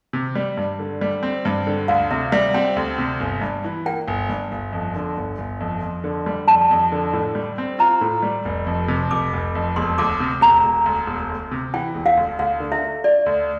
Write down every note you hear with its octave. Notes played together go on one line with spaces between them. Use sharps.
C3
G3
G2
D3
G3
C4
G2
D3
D2 F5
C3 E5
G3 E5
C4 G5
D2
C3
G1
G2
E3
A#3 G5
G1
G2
G1
F2
D3
G1
G1
F2
F2
D3
G3
F2 A5
F2
D3
A2
G3
C4
F4 A#5
A2
G3
F1
F2
C3
F1 D6
F1
F2
E1 C6
D2 D6
C3
E1 A#5
E1
D2
E1
D2
C3
E3 G5
E1
F5
D2
D2 F5
D3
E5
A3
D4 D5
D2